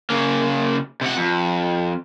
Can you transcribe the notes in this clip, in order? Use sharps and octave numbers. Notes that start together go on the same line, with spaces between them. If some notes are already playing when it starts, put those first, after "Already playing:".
C#3 A#3
C3 F#5
F2